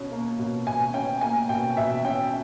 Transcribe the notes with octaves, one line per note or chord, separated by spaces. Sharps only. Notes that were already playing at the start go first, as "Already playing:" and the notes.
Already playing: B2 C#4
A#3
B2
B2 G#5
C#4 G5
A#3 G#5
B2 G5
B2 E5
C#4 G5